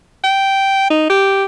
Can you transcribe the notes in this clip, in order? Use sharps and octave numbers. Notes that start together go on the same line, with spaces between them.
G5
D#4
G4